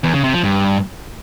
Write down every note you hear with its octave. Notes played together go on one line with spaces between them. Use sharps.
E2
C#3
C3
F3
G2